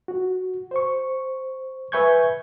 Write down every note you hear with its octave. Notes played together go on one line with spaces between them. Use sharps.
F#4
C5 C#6
B4 E5 G#5 C#6 G6 G#6